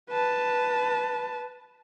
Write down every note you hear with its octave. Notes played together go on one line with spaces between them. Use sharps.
B4 A5